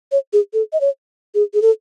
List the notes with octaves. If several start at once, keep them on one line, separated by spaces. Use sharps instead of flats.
C#5
G#4
A4
D#5
C#5
G#4
G#4
A4